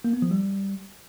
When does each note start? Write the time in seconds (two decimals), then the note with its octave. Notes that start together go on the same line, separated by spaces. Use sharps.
0.04 A#3
0.13 B3
0.22 F3
0.31 G3